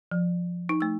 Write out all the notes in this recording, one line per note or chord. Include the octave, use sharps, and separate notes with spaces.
F3
D#4
A3 E6